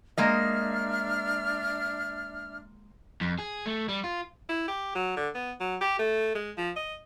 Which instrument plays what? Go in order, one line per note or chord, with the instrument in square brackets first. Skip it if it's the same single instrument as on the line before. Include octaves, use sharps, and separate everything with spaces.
[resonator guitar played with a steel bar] G#3 A#3 D#5 [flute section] D4 E5 F6
[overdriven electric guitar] F2
G#4
A3
G3
F4
[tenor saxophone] E4
G4
F#3
D3
B3
F#3
G4
A3
G#3
F3
D#5